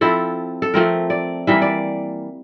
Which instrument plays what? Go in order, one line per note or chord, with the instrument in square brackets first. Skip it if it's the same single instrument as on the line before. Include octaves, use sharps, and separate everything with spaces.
[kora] F3 C4 E4 A4
A4
F3 A3 C4 A#4
D5
E3 G3 A#3 E5
D5